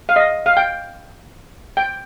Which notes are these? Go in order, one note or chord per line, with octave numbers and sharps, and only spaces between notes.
F5
D#5
F5
G5
G5